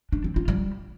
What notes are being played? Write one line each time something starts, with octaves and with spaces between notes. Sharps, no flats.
D4
C4
F4
G3